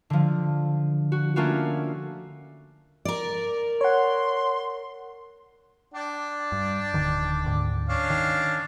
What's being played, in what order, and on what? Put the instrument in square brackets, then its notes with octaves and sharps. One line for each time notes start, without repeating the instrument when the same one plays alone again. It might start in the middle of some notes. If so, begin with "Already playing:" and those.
[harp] D3 F3
F#4
A3 A#3 C#4 D4 F4 F#4
[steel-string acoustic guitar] A#4 D5
[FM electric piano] C#5 F#5 [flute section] C6
[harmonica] D4 D5 G5
[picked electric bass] G2
D1 D3 D#3
D2 G#2 D3
[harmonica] C#4 D4 F5
[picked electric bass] D#3